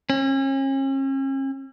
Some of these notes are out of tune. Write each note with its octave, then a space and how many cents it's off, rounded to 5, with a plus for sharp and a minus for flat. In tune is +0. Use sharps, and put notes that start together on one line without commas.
C#4 -40